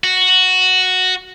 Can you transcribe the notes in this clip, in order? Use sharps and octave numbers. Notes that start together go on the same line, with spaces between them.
F#4